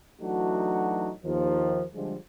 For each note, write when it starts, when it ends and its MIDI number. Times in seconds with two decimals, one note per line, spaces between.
0.21 1.11 52
0.21 1.11 54
0.21 1.11 57
0.21 1.11 62
0.21 1.11 63
0.21 1.11 66
1.24 1.83 39
1.24 1.83 51
1.24 1.83 53
1.94 2.14 50
1.94 2.14 53
1.94 2.14 55
1.94 2.14 56